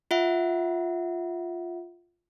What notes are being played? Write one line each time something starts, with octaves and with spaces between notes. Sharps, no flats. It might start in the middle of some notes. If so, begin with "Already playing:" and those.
F4 E5 F#5